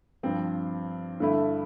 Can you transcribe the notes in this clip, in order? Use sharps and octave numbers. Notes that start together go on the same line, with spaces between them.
G2 F3 C4
G2 D3 A3 E4